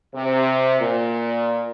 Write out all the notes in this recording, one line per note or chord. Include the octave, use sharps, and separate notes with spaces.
C3
A#2